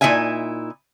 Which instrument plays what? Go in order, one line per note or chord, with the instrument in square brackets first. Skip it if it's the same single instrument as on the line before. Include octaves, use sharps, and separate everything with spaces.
[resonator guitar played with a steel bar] A#2 A#3 D#4 E4 E5 G#5